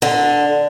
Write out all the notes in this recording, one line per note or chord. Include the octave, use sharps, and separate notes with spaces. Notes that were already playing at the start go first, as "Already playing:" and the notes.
D3